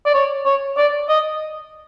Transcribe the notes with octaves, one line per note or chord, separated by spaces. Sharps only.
D5
C#5
C#5
D5
D#5